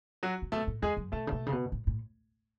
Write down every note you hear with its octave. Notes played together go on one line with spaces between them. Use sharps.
F#3 F#4
C#3
B2 A3 A4
A2
E2 G#3 G#4
F#2
B2 A3 A4
C#3
B2
C#3
B2
A2
A2